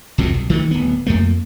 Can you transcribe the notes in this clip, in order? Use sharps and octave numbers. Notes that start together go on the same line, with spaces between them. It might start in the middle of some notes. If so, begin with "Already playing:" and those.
C2 F2 A2 C3
B1
D#3 E3 A3
D1 B3
F2 A3 A#3